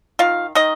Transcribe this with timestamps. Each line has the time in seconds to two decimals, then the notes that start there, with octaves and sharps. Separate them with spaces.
0.19 D#3 F4 F5
0.55 D#3 D#4 D#5